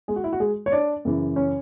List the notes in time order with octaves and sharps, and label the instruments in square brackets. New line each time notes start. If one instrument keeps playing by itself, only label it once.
[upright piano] G#3 G#4
F#4
E4
F#4
G#3 G#4
C#5
D4 D5
F#2 C#3 E3
C#4 C#5